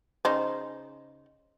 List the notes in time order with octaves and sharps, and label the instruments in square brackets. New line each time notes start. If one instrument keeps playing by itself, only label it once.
[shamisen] C#3 D#4 C5